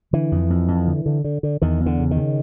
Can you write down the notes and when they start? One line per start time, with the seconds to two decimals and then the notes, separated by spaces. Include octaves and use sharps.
0.13 D3 E3
0.32 F2
0.50 F2
0.68 F2
0.87 D3
1.06 D3
1.24 D3
1.43 D3
1.62 E2 D#3
1.80 E2
1.86 D3
1.99 C#3
2.11 D#3
2.17 C#3